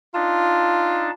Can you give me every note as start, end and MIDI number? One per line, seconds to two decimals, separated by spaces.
0.15 1.10 62
0.15 1.10 63
0.15 1.11 65
0.15 1.10 81